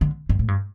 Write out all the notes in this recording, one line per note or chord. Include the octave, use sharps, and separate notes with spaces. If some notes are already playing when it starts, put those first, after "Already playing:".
D3
G2
A2
G2